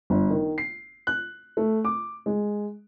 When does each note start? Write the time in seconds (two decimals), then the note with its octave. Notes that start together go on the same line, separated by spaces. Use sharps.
0.10 G1
0.30 D#3
0.58 C7
1.07 F#6
1.57 A3
1.85 D6
2.26 G#3